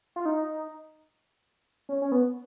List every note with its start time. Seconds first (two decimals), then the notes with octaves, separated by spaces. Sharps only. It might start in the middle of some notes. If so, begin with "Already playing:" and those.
0.16 F4
0.25 D#4
1.89 C#4
2.02 C#4
2.12 B3